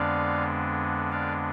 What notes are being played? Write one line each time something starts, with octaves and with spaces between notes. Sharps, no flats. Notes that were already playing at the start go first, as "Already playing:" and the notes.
Already playing: F2 D3 G#3 B3 D4 D5 F5
D5 F5